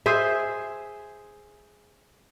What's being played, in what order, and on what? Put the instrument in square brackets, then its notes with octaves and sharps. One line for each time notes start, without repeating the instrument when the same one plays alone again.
[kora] G#4 C5 E5